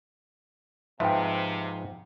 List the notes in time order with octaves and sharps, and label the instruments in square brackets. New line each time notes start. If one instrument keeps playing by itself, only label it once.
[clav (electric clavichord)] G#2 F3 B4 [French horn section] C3 [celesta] E5 G5